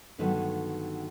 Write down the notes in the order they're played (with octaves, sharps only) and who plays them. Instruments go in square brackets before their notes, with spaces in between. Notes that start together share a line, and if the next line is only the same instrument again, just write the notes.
[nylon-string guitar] G2 D3 D#3 F#3 A3 B3